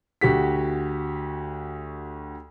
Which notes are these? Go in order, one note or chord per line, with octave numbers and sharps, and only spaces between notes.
D2 F#4 G4 B6